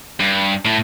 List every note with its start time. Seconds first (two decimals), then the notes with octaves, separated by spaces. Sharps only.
0.20 G2
0.65 A2